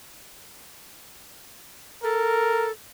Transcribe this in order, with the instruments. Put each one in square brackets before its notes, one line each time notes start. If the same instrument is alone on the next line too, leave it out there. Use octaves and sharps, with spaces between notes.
[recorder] A4 [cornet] A#4